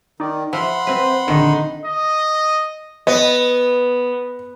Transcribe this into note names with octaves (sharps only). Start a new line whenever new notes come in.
D#3 D#4 D5
F3 E5 F#5 B5 C6
C4 B4 C5
A#1 D3 D#3 D#4
D#5
B3 D#5